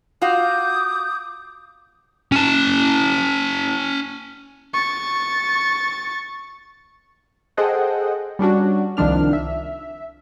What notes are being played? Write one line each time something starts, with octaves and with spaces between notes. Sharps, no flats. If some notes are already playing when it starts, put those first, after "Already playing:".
F4 F#4 F5 D6 D#6 G6
C#4 A5
C#6 A6
G#4 A4 C5 D#5 F#5 G5
G3 C#4 D4 F#4
C2 D#3 F3 D4 F6
E5